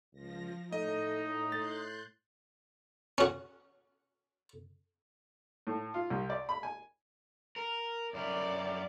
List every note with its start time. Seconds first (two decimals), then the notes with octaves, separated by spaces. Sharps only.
0.13 C#2 F3 A#6
0.73 A2 A3 D#4 D#5
1.52 A2 C6 F#6 G6 A6
3.18 C#4 F#4
5.67 A2
5.94 F4
6.10 C2
6.30 D5
6.49 B5
6.63 G#5
7.56 A#4
8.14 F#2 E4 A#4 D5